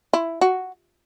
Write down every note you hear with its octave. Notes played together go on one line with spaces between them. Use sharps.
E4
F#4